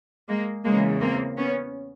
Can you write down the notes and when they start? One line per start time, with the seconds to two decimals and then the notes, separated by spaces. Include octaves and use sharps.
0.28 G#3 A#3
0.64 E2 C#3 E3 G#3 A#3
1.01 A#3 C4
1.37 B3 C#4